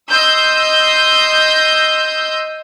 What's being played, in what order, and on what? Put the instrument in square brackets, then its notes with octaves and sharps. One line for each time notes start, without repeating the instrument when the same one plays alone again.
[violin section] D#5 C6 E6 G6